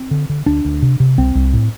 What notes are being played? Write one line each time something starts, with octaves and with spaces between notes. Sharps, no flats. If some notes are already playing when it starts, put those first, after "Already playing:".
Already playing: C4
D3
D3
D2 D4
D2
C3
C3
C2 C4
C2
A2